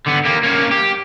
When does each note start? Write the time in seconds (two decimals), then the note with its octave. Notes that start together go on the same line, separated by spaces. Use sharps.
0.06 D3 B3
0.25 A#3 G4
0.43 A#3 C#4
0.71 G4